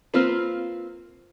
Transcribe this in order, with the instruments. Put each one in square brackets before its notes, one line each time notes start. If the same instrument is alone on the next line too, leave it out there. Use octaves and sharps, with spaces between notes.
[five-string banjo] A#3 C4 F4 B4